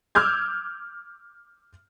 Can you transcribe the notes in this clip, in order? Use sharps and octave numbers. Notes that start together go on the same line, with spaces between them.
D6 E6 F6 G6 G#6